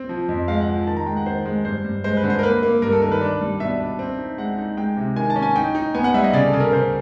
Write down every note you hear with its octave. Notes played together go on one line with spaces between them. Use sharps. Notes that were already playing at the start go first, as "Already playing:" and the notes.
Already playing: C4
F3
F2
G#3 F5
F#5
F3
D#3 A5
A#5
G#3 G5
F#5
D#3 C5
G#3
G2 C5
G2
G#3 C5
B4
D3
C5
A#4
A#3 B4
A#3
G2 A#4
A4
D#3 A#4
B4
D4
G3
B2 E5
D4
C4
D#4
G#3 F#5
D#4
G#3 G5
C3
D#3 G#5
A5
C#4
G#5
D#4 G5
D#4
B3 G#5
F#5
G3 E5
D#5
C#3 D5
A4
C#3
A#4
C#3 C5